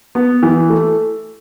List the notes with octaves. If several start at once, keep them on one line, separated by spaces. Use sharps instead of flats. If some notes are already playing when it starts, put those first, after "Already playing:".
B3
E3
A3